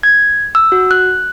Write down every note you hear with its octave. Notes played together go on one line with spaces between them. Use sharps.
G#6
E6
F#4
F#6